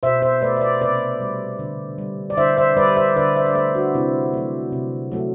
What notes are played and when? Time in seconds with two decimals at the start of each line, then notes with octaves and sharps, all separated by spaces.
0.03 B2 C5 E5
0.22 C5 E5
0.42 A3 B4 D5
0.56 E5
0.61 B4 D5
0.81 C3 B4 D5
1.20 G3
1.59 D3
1.98 G3
2.30 D5
2.37 D3 C5 E5
2.57 C5 E5
2.77 G3 B4 D5
2.96 C5 E5
3.16 D3 B4 D5
3.36 C5 E5
3.46 D5
3.55 A3 C5 E5
3.75 D4 F#4
3.94 C3 C4 E4
4.33 F#3 A3
4.72 C3
5.12 F#3 A3